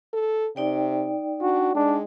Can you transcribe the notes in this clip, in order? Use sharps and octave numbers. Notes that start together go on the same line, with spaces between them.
A4
C3 D#4 D5 G5
D4 F#4
G#3 D4